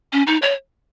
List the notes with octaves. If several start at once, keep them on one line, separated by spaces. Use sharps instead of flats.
C#4
D#4
C#5